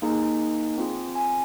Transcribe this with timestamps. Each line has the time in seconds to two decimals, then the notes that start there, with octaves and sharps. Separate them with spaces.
0.02 A#3 D#4 G#4
0.78 C4 F4 G#4
1.15 G#5